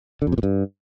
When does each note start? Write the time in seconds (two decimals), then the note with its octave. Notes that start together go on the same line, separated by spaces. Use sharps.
0.22 D3
0.27 F2
0.32 C3
0.38 A#2
0.43 G2